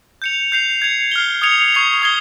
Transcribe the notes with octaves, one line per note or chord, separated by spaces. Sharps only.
G6 C#7 F7
G6 C7 F7
G#6 C#7 F7
F6 C7 G7
D#6 G#6 C#7 F7
C#6 G#6 C7 F7
D#6 G#6 C7 G7